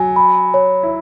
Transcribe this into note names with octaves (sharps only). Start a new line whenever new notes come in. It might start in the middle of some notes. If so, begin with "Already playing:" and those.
Already playing: F#3 G#5
B5
C#5
E4